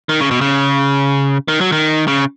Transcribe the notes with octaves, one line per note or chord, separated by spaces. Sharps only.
D#3
C#3
B2
C#3
D#3
F#3
D#3
C#3